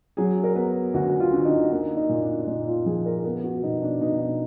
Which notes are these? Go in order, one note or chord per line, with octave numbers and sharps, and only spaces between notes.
F#3 G#4
A#4
B3
D2 F#4
F4
D3
D#4
A#3 D#4
D#4
A#2
D4
A#2 D#4
F4
F3 G#4
A#4
B3 A#4
F#4
B2 D#4
D4
B2 D#4
D#4